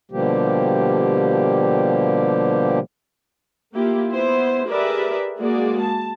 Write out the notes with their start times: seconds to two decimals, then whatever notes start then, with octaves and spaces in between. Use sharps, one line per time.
0.11 B2 D3 F3 G3 A#3 G4
3.75 A#3 E4 F4 G4
4.12 B3 E4 C5
4.67 G4 G#4 A#4 B4 D5 E5
5.38 G#3 A#3 F#4 G#4 D5
5.80 A5